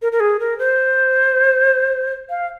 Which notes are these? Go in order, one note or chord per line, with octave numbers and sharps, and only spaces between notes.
A#4
A#4
G#4
A#4
C5
F5